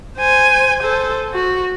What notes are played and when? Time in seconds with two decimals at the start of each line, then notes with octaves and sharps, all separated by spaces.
0.18 C5 G#5
0.83 A4 C5
1.33 F#4